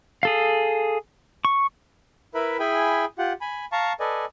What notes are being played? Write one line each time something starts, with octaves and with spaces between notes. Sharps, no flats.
G#4 A4 F5
C#6
E4 A#4 B4 E5 B5
E4 G#4 G5 G#5 B5
F4 G4 F#5
G#5 B5
F5 A5 A#5 C#6
A4 B4 D5 D#5 G#5